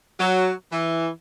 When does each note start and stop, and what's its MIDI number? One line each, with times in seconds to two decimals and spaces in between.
0.20 0.51 54
0.72 1.09 52